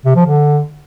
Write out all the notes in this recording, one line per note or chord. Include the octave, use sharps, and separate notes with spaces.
C3
F3
D3